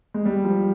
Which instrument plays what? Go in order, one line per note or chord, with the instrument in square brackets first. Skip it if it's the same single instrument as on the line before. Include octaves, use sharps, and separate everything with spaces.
[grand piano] G#3
G3
F3